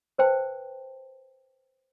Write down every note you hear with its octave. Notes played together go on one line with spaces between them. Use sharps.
B4 C5 G5 A5